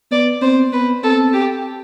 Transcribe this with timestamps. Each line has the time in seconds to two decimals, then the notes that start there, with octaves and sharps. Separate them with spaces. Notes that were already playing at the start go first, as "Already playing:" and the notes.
0.11 B3 D5
0.42 C4 C5
0.73 B3 B4
1.03 C4 A4
1.33 G4